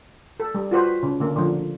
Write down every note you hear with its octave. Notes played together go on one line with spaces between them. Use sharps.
A4
G3
F4 F#4 B4 C5
C#3
D3 A#3
D3 F3